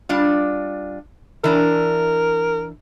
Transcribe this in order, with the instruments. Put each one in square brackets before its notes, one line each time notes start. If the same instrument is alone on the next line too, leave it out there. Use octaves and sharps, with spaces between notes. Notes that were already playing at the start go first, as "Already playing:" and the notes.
[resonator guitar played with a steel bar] G3 D4 F4
[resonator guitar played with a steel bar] E3 D4 [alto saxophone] A#4